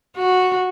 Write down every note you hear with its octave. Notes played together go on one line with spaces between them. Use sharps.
F#4